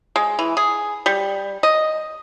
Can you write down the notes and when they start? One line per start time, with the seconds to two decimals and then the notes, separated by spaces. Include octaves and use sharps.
0.16 G#3
0.39 E3
0.57 G#4
1.06 G3
1.63 D#5